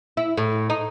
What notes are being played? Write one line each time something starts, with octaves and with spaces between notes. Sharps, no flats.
E4
A2
D#4